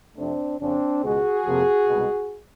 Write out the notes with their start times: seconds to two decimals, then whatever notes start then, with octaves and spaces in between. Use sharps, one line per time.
0.16 F2 C3 F3 A3 C4 D4
0.60 F2 C#3 F3 C4 D4
1.03 C#2 B2 G#3 F#4 G#4
1.46 F2 C3 F3 A#3
1.89 C2 B2 G#3